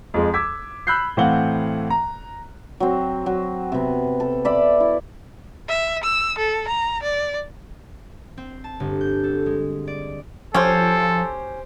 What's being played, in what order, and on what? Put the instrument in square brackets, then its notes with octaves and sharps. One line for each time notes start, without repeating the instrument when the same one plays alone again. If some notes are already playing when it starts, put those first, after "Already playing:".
[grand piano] F2 F3 G#3
D6 E6 G#6 B6
B5 E6 F#6 G6 C7
A2 E3 C4 F5 F#5 G7
A#5
[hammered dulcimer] F#3 C4
F#3
C3 B3
A4
D5 E5 B5
E4
[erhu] E5
E6
A4
A#5
D5
[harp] C4
A5
G1
G6
A4
G#3
D5
[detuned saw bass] F3 [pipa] C#4 [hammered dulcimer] G4 C5 [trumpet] A4